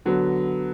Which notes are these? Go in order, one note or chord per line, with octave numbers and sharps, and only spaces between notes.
D3 F#3 B3